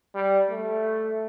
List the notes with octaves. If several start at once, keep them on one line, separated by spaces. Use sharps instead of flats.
G3
A3